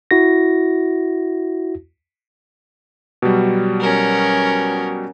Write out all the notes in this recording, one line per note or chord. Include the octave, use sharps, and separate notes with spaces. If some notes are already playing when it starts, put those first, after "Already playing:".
E4 F#4 A#6
B2 F#3 G3
C#4 A#4